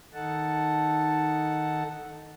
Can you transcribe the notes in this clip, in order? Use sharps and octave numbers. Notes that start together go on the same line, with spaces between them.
D#3 D#4 A4 F#5 A5